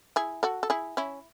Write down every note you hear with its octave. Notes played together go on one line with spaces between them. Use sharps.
E4 G#4
F#4 A4
A4
E4 G#4
C#4 E4